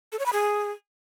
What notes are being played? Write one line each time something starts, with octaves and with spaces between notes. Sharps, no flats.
A4
C#5
B5
G#4